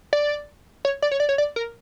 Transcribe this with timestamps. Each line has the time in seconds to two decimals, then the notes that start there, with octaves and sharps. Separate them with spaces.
0.13 D5
0.85 C#5
1.02 D5
1.11 C#5
1.20 D5
1.29 C#5
1.38 D5
1.56 A#4